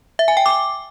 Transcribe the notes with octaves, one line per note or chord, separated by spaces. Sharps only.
E5
G#5
G5
D6